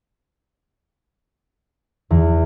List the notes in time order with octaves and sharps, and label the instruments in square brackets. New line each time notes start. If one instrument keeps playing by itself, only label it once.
[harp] E2